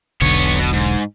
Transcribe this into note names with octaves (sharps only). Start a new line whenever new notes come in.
E1 B1 D3 B3 C#5
B2
G#2